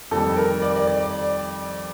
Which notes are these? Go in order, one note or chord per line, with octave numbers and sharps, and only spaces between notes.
F2 D#3 G3 A4
A#4
D5
D5
D5